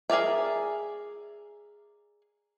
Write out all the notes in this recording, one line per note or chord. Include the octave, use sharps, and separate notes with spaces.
G#4 A#4 D5 E5